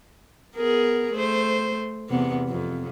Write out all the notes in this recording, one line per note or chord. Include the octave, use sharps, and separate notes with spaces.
B3 G#4 A#4
A3 C5
E2 C3 B3
F2